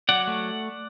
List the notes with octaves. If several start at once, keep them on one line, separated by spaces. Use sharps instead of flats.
F#3 D5 F#5
A3